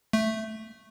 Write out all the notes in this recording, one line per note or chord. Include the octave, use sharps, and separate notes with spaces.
A3